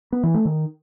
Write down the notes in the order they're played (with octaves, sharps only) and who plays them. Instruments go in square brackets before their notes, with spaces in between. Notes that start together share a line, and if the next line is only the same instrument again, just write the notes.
[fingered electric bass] B3
E3
A3
D#3